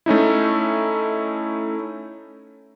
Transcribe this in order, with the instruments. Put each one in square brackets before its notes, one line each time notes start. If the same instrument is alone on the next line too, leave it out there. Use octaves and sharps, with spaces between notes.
[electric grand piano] A3 C#4 D#4 E4